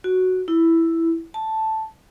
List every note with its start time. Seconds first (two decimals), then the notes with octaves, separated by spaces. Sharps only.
0.04 F#4
0.48 E4
1.34 A5